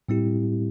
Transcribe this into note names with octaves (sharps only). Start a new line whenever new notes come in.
A2 G3 C4 E4 G4